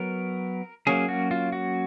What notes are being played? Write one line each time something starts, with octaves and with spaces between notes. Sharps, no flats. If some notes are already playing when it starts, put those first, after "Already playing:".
Already playing: F#3 B3 A#4
F#3 A#3 C#4 G#4
F#4
F4
F#4